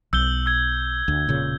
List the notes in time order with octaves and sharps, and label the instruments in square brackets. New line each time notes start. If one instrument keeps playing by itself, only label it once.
[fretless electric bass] B1 [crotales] E6 G6 G7
[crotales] E6 G#6 G7
[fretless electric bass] D2
E1 A#2 C#3